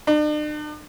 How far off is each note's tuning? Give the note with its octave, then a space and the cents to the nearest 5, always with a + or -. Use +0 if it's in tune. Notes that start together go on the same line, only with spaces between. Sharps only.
D4 +45